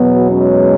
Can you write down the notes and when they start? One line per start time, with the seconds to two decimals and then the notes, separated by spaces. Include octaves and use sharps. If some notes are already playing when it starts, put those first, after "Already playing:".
Already playing: E2 B2 F#3 B3
0.32 G#3 C#4